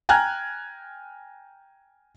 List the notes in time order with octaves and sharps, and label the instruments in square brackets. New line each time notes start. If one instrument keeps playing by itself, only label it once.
[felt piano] G5 G#5 A#5 F6 F#6 G#6